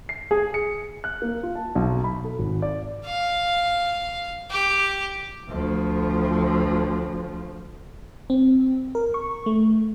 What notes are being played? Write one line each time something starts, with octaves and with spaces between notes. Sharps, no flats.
C7
G#4
C#7
F#6
A#3
F4
A5
B1
B5
A4
G#1
D5
F5
G4
D2 F3
C4
A#4
C#6
A3